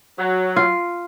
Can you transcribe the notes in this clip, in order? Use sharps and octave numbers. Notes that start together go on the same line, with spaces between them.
F#3
F4